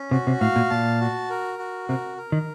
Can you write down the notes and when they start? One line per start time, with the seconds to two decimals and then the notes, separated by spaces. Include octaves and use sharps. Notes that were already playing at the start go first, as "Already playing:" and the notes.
Already playing: C#4
0.11 C3 F#4
0.27 C3
0.40 A2 F5
0.56 A#2
0.70 A#2 A5
1.01 F#4
1.30 A#4
1.59 F#4
1.89 C3 A#4
2.17 A#4
2.32 D#3